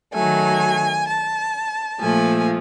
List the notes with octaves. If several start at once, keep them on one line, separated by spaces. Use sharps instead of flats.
D#3 F#3 A3 G#5
A5
A#2 F3 A3 G#5